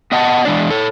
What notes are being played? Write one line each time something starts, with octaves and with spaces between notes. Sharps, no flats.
B3 D#5 F#5 G#5 A5
E3 G#3 D4 D5
A4 C#5